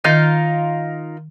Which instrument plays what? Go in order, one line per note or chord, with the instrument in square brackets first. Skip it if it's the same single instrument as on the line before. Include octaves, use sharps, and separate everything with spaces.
[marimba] D#3 D#5 [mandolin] D#4 F4 A#4